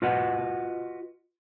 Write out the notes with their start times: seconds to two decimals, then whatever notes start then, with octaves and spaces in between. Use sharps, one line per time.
0.02 F4 F#4 B4 D#5 F#5